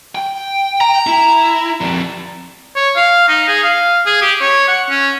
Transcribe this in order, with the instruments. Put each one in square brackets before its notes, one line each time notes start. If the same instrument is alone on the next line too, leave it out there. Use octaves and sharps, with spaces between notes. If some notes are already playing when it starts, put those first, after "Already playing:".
[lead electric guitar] G5
[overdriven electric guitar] A#5
[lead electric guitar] E4
F2 D4
[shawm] C#5
F5
D#4
G#4
F5
G#4
G4
C#5
F#5
C#4